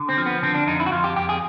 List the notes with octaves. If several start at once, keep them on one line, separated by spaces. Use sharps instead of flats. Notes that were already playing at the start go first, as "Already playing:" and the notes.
Already playing: D3
C4
F3
B3
D3 C4
D4
F2 D#4
E4
F#4
F2 F4
G4
F2 G4
G#4